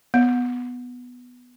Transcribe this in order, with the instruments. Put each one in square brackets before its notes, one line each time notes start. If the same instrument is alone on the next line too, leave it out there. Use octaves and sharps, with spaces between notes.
[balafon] B3